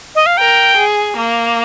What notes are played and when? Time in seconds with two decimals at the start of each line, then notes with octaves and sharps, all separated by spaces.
0.15 D#5
0.26 F5
0.38 A#4 G5
0.77 G#4
1.17 A#3